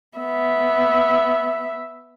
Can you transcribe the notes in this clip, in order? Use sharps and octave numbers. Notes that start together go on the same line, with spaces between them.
B3 E5